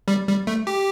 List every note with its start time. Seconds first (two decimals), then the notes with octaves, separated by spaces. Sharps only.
0.08 G3
0.28 G3
0.47 A3
0.67 G4